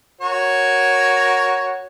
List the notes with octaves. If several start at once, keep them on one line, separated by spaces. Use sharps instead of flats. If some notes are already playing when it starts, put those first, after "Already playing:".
F#4 A#4 C#5